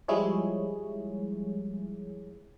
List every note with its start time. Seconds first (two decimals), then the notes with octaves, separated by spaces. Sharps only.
0.08 F3 G3 G#3 E4 G#4 C#5